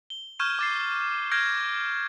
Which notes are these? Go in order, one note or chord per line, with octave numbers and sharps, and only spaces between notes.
G7
C#6 F6 G6 G#6 D#7 E7
D6 A6 C7
F6 G6 G#6 A#6 C7 D7